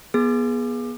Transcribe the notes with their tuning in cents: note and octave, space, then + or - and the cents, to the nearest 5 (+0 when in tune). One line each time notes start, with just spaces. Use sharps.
B3 -30 G#4 +0